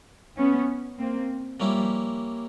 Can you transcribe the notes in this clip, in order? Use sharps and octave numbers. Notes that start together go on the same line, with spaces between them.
B3 C#4
A#3 C4
F3 G3 A#3 C#4 E4 G4